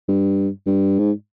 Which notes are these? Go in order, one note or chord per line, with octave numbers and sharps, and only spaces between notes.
G2
G2
G#2